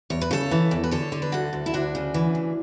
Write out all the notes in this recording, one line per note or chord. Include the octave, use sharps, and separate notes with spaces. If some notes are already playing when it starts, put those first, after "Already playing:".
E2 C#5
B4
C#3 A4 C#5
E3
E2
B4
D3 A4 C#5
D3
B4
D2 F#4 A4
D2
E4
D2 D4 F#4
C#3
E3
D2